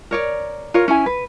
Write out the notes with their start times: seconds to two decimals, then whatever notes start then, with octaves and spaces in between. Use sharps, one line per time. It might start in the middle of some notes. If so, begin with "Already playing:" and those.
0.11 A#4 C#5 D5
0.74 F4 A#4 C#5
0.88 C#4 E4 G#5
1.06 B4